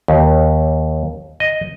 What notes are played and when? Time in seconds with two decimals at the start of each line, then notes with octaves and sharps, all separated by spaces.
0.08 D#2
1.40 D#5